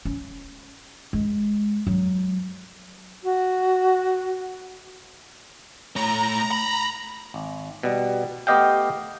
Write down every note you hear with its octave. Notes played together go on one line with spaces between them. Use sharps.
C#4
G#3
F#3
F#4
A3 C#5 A#5
B5
G#1
B2 G3
A3 B3 G4 D#5 F5 G5